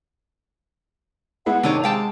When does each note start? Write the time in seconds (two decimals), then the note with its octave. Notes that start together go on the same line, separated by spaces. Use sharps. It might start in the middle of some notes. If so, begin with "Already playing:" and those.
1.46 G#3 B3 E4 F#5
1.63 G#2 C3 D#3 D4 C#5 D#7
1.83 G#3 F5 G5 A5